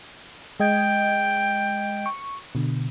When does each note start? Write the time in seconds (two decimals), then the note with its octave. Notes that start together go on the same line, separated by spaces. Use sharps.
0.60 G#3 D#5 G5 G#6
2.06 C#6
2.55 B2 D3